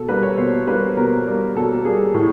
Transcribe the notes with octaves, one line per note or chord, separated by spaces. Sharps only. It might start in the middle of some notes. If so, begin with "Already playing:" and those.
Already playing: B2 A4
G3 A#3 B4
C#5
B2 C5
G3 A#3 B4
B2 A#4
G3 A#3
B2 A4
G3 A#3 G#4
A2